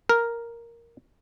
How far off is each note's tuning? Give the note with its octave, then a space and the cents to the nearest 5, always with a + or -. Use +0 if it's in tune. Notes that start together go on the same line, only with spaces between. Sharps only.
A#4 +0